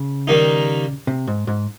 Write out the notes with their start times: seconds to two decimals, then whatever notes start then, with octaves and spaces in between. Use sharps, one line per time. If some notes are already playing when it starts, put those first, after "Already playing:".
Already playing: C#3
0.27 D#3 G3 A#3 D#4
1.07 C3
1.27 G#2
1.47 G#2